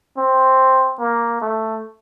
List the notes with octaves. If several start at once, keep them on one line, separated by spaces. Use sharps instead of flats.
C4
A#3
A3